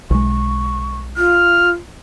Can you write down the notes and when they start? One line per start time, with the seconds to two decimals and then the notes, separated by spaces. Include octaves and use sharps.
0.10 B1 G#3 C#6
1.18 F4 F6